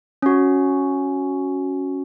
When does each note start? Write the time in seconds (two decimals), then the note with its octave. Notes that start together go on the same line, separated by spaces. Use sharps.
0.22 C#4 F#4